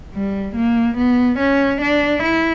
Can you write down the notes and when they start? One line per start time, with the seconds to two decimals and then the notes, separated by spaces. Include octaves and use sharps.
0.14 G3
0.56 A#3
0.98 B3
1.39 C#4
1.81 D4
2.23 E4